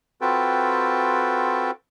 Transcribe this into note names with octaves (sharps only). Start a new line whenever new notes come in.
C4 F4 F#4 A4 B4 G5